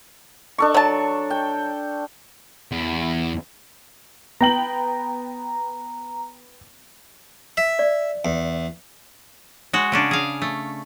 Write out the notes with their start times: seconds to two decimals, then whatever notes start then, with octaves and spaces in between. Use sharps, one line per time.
0.58 D4 A4 C#6
0.75 F#3 A5
1.30 G5
2.72 E2
4.41 B3 G5 A#5 F#7
7.57 E5
7.79 D5
8.25 E2
9.73 G#3 F#4
9.92 C#3 C#4 D4
10.11 G#4 F5
10.42 A3